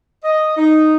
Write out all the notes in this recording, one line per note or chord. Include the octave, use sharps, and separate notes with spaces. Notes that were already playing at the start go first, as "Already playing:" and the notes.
D#5
D#4